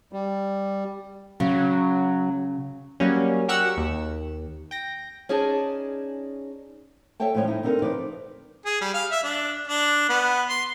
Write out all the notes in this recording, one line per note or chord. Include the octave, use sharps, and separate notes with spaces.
G3
C#3 F#3
F#3 G3 A#3 C#4
F#4 G4 A#4 F#5 C#6 E6
D#2
G5 A#6
C#4 D#4 G#4 D5 A5
A4 C#5 E5 G5 A5
A2 E3 F3 G#3 C#4 C#5
D#4 E4
D3 C4 D#4 A4 A#4
F3 B4 D5
G#4
G3
F5
E5
D4
D4
B3
C6